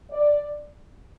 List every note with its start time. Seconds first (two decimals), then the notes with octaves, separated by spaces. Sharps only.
0.12 D5